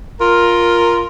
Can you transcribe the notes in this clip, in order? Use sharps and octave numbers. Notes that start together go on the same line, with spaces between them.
F4 A#4